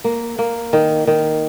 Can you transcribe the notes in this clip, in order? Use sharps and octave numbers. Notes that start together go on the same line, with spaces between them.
A#3
A#3
D#3
D#3